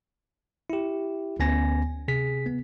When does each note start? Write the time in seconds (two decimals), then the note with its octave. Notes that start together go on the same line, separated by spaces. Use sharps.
0.70 E4 G4
1.39 D2 B3 C#4 G#5 A#6
2.08 C3 G#4 B6
2.46 B3